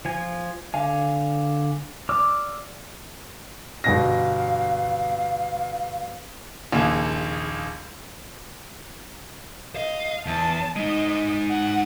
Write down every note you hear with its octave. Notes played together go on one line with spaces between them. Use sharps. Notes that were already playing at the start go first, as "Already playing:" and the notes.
F3 G#5
D3 F5 G#5
D5 D6 E6 F6
G1 B2 F5 A#6
A#1 D#2 C#3
D#5 F5
E2 A5
G#3 D#4 D#5
F#5